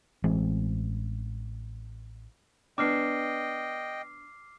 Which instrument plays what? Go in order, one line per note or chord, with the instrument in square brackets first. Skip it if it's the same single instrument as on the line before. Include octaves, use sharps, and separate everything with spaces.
[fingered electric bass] A1 E3 G#3 C4
[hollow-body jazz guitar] B3 D4 [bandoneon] D#5 G5 [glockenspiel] D6 F6 C7